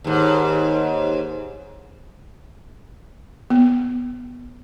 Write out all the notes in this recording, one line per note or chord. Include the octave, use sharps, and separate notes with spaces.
D#2 G#2
B3